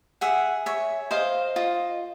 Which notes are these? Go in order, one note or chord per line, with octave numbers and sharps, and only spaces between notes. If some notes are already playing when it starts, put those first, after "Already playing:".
G#4 E5 F#5
C#5 E5
C5 D#5 F5
F4 D#5